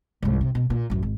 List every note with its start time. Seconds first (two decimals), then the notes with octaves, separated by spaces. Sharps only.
0.22 C2 G#2
0.41 C3
0.55 B2
0.70 A#2
0.90 A1 F#2
1.03 G#1